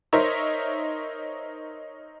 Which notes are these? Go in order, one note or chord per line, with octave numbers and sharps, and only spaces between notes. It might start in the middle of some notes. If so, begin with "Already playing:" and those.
D#4 A#4 C5 C#5 E5